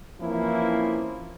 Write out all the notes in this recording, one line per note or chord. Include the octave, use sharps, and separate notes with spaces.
E3 F3 A#3 C4 C#4 E4